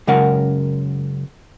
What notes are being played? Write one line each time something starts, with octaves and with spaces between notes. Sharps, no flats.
F#2 C#3 G#3 C#4 A#4 F#5